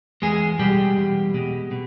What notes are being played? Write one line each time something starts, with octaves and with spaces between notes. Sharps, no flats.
E2 G#3 G#4
B2 G3 G#3 G4
E2
B2 G#3
B2